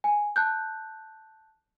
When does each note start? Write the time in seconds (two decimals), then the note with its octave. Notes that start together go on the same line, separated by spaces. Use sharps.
0.04 G#5
0.36 A5 F#6 G6